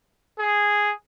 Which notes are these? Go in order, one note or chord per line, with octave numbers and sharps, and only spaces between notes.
G#4